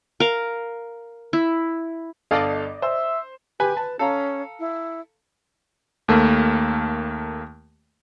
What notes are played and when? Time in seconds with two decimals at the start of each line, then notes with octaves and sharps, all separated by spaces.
0.20 A#4 F5
1.33 E4
2.31 G1 A4 D5 D#5 F5
2.82 C5 E5
3.60 G4 B4 G#5
3.77 B4 A5
3.99 C#4 A4 F5 A#5
4.59 E4
6.08 D#2 A3 A#3